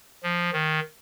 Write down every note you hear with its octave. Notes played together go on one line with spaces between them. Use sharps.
F3
D#3